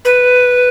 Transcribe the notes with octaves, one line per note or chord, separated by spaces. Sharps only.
B4